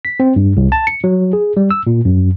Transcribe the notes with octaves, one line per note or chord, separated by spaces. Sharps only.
B6
C4
G2
C2
A5
C#7
F#3
G#4
G3
E6
A#2
F#2